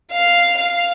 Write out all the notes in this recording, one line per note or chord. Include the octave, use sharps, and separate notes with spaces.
F5
F5